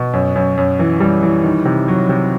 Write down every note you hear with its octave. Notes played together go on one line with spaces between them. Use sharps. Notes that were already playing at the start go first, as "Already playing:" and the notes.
Already playing: B2
F#2
F#2
F#2
E3
G3
E3
D#3
C3
F#3
C3